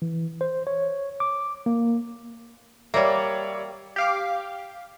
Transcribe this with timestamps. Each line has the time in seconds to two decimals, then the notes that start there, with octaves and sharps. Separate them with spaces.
0.02 E3
0.41 C5
0.67 C#5
1.20 D6
1.66 A#3
2.94 G3 A#3 C#5 D5 E5
3.96 G4 F5 D6